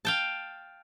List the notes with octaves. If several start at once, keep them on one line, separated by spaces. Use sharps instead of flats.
F5 G5 A5